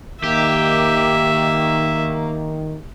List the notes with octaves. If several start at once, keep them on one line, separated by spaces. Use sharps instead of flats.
D#3 A#3 G4 E5